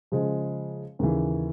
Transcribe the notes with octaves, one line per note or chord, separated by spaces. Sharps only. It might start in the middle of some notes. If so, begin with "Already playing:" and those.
C#3 F3 G#3
D#2 C#3 E3